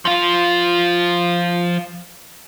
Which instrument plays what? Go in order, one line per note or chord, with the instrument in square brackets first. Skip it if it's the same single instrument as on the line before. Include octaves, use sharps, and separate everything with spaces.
[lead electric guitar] F3 F4